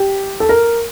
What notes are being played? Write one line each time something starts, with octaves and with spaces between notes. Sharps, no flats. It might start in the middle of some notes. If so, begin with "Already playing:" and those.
Already playing: G4
A4
A#4